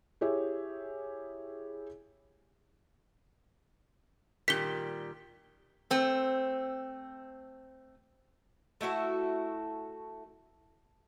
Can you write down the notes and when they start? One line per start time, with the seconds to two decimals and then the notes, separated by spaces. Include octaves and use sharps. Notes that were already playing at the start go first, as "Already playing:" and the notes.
0.21 E4 G4 G#4 C#5 E5
4.48 A#2 D#3 G3 B6 G7
5.90 A3 C4
8.81 A3 E4 F#4 A4